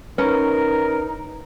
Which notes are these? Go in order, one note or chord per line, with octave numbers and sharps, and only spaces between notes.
C#4 D#4 A#4 B4